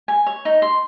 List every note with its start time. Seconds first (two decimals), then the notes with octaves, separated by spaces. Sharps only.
0.08 G#5
0.26 C#5
0.45 D#4
0.62 C6